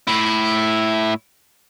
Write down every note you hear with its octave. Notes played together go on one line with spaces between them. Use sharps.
A2 E4